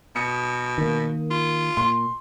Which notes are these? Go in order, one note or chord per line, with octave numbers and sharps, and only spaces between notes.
B2 D#6 C#7
D#3 A#3
F4
A#2 C6